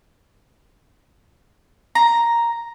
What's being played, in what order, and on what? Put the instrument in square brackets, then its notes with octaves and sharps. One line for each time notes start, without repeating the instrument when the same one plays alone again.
[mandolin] A#5